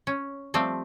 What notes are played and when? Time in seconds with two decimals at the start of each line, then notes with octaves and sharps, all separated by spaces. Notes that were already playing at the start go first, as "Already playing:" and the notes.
0.07 C#4
0.54 F3 G3 A3 C4